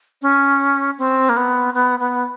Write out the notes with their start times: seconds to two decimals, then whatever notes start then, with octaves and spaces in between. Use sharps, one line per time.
0.22 C#4
0.98 C4
1.29 A#3
1.37 B3
1.74 B3
2.00 B3